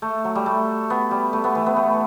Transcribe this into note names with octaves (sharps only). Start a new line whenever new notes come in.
A3
F#3
G3
A3
B3
G3
A3
B3
E3
B3
A3